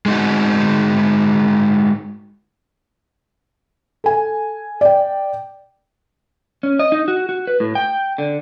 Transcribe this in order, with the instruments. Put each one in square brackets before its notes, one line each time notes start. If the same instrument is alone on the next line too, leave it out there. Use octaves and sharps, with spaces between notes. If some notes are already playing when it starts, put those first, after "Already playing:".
[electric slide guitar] G#3 D#4 F#4
[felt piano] A4 G#5
D5 G5
[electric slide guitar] C#4
D#5
D#4
F#4
F#4
B4
A2
G5
D3